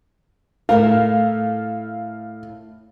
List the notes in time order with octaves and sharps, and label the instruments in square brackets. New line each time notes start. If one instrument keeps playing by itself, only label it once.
[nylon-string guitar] A2 A3 A#4 [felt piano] F5